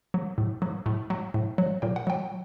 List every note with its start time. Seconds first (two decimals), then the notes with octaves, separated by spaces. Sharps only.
0.14 F#3
0.38 A2
0.62 F#3
0.86 A2
1.10 F#3
1.34 A2
1.58 F#3
1.82 A#2 G5
1.96 F#5
2.07 F#3 G5